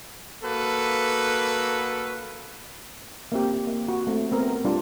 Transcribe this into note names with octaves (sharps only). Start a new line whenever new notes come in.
A#3 F#4 A4 B4
A#3 C4 G4
A#3
F#4
A3 C4
B3 C4 A#4
G3 D4 F4